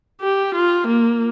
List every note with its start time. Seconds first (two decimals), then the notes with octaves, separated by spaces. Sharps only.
0.21 G4
0.55 F4
0.87 A#3